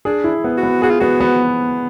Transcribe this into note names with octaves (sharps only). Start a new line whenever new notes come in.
D4 G#4
E4
B3
F#4
B3
F#4 G#4
F4
B3 F#4
B3